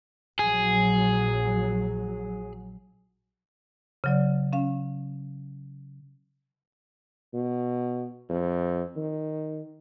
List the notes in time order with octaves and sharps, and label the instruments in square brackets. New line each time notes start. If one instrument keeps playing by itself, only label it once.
[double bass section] A#1 F#3 [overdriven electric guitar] G#4
[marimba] C#3 F#3 D5
C#4 F5
[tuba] B2
F2
D#3